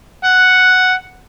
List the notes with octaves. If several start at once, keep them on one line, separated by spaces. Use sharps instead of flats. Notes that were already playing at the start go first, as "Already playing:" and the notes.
F#5